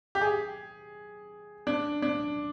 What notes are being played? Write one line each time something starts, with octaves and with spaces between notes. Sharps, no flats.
G4
G#4
D4
D4